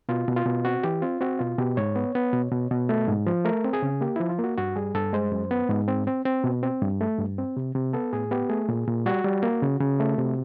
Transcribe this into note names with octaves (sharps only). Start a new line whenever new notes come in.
B2 F4
B2
F4
B2
C4 F#4
E3 G4
C4 F4
C4 F#4
B2 F4
B2 G4
G#2 C#5
B3
B3
B2
B2
B2
A3
G#2
F3
A3 A#4
C4
G#4
C#3
A#3 G4
F3 E4
F4
A#3
F#4
G2 F#4
G3 G#4
G2 A4
G#3 C5
F#2
B3
G#2
C4
C4
C4
B2
C4
G2
A3
G2
C4
C3
C3
B3 A4
A2 G#4
B3 G4
A3 G#4
A#2
A#2
G3 F#4
G3
A#3
C#3
C#3
A3
C3